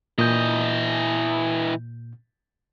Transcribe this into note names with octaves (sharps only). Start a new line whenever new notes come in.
A#2 E3 D#5 G6